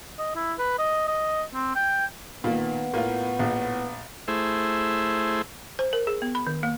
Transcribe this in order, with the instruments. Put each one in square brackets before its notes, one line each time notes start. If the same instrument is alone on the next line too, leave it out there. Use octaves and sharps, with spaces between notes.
[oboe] D#5
E4
B4
D#5
D#5
C4
G5
[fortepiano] A#2 [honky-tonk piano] D#3 A#3 [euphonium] B3
[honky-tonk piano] A2 F4 [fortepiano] A#3
[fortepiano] A#1
[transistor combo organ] A3 E4 G#4 C5
[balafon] C5
A#4
G#4
B3
B5
D#3
A#3